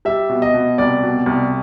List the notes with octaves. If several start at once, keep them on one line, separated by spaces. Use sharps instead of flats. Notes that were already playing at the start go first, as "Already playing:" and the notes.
G3 E5
B2
D#5
B2
C2 D5
B2
C2